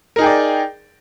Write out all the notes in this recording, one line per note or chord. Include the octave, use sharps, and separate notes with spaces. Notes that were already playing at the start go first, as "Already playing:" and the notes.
D#4 G#4 A#4 D5 G5